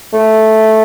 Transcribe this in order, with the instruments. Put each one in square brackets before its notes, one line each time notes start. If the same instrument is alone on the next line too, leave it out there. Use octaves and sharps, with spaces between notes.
[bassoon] A3